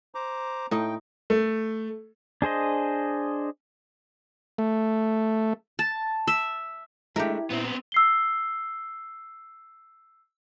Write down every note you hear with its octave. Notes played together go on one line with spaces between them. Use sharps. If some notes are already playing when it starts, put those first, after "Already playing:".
C5 A#5 D6
A2 D#4 G5
A3
D4 G#4 C5 D#5
A3
A5
E5
G#3 A3 D4 E4 G4 A#4
A#2 B3 C4
E6 C7 G7